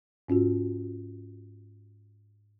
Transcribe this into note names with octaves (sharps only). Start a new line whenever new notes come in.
G#2 C#4 F4 F#4